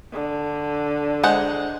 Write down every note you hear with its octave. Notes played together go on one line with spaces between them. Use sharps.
D3
G#3 C5 F#5